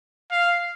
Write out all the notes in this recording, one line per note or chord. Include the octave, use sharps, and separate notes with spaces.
F5